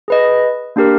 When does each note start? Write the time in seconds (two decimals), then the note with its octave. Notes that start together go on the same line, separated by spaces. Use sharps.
0.08 G#4 B4 D#5
0.76 A#3 D4 G4 A#4